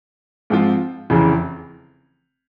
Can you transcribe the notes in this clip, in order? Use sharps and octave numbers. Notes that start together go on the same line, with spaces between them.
G#2 F3 C4 F4
F1 E2 C#3 E3